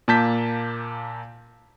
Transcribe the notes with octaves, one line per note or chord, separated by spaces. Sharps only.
A#2 A#3 A5 G6 B6